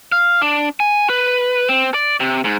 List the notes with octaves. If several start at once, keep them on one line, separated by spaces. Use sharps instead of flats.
F5
D4
G#5
B4
C4
D5
C3
G#2